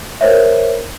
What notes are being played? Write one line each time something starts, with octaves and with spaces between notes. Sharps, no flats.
A#4 C5 C#5 E5